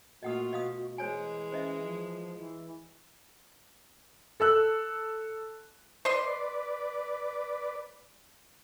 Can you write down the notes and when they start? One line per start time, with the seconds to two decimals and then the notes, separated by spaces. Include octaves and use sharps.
0.23 A#2 A3 F4 F#4 D#5 F#5 D#6
0.53 B2 D#5 F5 D#6
0.98 E3 G#3 C5 C#5 G#5
1.52 C#4 C5 D#5 E5
1.83 F3
2.38 E3
4.40 A4 E6 F#6
6.05 B4 C5 D5 D#5 C6